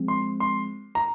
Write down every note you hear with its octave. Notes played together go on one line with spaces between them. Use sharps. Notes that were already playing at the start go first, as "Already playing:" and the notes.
Already playing: F3 G#3 C4
C6
C6
A#5